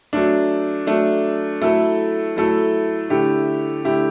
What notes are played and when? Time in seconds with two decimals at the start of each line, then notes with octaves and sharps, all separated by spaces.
0.13 F#3 A3 D4
0.87 F#3 A3 D4
1.61 F#3 A3 E4 A4
2.36 F#3 A3 E4 A4
3.10 D3 A3 E4 G4
3.85 D3 A3 E4 G4